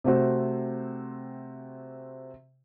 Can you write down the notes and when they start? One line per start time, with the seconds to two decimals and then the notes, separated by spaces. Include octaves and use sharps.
0.04 C3 A3 C4 F#4 C5